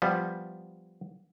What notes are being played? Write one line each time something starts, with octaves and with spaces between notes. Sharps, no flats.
F3 G3 B3